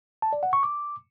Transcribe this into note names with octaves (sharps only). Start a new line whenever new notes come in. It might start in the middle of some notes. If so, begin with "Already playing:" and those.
A5
D5
F#5
C#6
D6